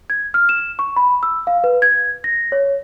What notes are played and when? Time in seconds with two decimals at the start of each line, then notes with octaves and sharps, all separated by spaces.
0.10 G#6
0.34 F6
0.49 E7
0.79 C#6
0.96 B5
1.23 E6
1.47 F5
1.64 B4
1.82 G#6
2.24 A#6
2.52 C#5